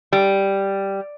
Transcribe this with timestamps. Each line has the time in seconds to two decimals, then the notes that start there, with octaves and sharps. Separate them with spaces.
0.13 G3